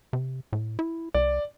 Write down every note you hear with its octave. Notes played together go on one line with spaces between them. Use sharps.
C3
A2
E4
C2 D5